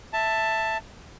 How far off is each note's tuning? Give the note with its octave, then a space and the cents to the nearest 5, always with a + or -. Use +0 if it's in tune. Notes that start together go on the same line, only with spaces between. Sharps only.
E5 +0 A5 +10